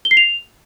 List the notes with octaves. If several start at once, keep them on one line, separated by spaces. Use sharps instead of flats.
G7
C7
F7